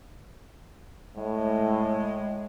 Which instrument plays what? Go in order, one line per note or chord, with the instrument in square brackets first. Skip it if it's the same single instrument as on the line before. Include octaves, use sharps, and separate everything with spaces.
[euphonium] A2 [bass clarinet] G#3